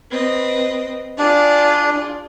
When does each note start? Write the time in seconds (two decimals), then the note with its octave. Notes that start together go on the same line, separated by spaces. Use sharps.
0.11 C4 B4 D#5
1.19 D4 F4 G#4 D5